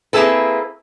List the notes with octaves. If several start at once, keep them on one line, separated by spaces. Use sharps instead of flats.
A#3 C4 E4 G#4 A4 B4